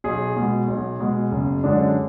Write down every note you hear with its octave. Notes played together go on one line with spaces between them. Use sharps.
B1 G#4
B2 G#3
B1
B2 G#3
F#1
F#2 D3 G#3 D4